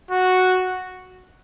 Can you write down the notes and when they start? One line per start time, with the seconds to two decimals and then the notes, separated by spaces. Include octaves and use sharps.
0.11 F#4